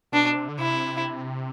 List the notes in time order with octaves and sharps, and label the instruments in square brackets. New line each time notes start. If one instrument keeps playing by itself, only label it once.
[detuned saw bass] B2 [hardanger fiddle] D4
[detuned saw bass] C3
D3
[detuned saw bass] C3 [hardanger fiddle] E4